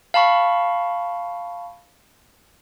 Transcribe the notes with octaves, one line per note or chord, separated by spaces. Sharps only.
F5 A5 B5 C#6